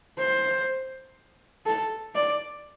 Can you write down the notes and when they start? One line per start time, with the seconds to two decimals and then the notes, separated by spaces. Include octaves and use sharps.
0.19 C5
1.66 A4
2.15 D5